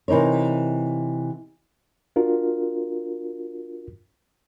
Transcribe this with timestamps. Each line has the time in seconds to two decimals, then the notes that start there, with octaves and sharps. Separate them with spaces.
0.08 C3 E3 D#4 A#4 C#5
2.16 D4 F4 F#4 A#4